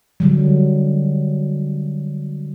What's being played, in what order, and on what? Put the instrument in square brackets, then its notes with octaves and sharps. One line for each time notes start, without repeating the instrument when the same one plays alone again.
[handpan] D3 F#3 G3